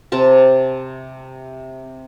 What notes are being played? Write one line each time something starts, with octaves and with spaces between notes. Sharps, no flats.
C3 C4 A5